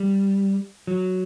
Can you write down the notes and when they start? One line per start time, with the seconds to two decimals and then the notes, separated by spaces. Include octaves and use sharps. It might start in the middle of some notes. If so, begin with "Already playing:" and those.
Already playing: G3
0.87 F#3